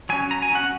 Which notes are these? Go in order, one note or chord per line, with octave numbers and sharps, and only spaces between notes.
F#3 C#4 G#5
A#5
G#5
F#3 C#4 F#5